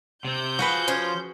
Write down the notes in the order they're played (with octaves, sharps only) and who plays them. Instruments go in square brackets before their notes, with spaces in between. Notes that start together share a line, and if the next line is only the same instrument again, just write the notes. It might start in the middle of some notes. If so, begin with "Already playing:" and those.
[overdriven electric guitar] C3 C4 [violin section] G6
[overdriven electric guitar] F3 [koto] F#4 G#4 B4
[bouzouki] C#4 C5